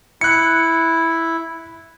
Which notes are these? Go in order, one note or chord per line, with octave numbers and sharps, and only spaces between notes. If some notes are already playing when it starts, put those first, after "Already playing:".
E4 F#6 C#7